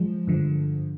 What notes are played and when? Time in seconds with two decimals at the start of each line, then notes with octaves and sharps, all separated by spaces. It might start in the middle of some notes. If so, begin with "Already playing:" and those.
Already playing: F3 G#3
0.27 G2 D3 F3